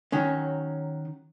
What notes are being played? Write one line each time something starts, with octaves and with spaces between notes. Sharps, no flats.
D#3 F#3 C#4